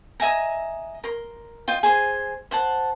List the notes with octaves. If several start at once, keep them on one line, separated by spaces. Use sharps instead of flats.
D#5 E5 G#5 A#5
A#4 C6
F4 D#5 G5
G#4 C5 G#5
C5 F#5 A5